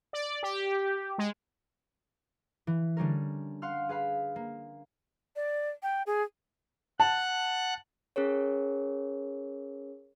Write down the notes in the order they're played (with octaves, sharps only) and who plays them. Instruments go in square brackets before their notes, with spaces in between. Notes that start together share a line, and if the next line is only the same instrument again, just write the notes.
[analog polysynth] D5
G4
G#3
[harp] E3
D3 G3 C#4 A#4
F5 F#5 C6 F6
G#4 B4 F5 B5
A#3
[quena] D5
G5
G#4
[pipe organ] F#5 F#6 [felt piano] A5
[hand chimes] C#4 G#4 A#4 C#5